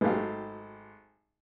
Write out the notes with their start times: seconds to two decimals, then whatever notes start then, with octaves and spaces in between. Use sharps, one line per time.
0.01 G#1 F#3 A3 G4 F5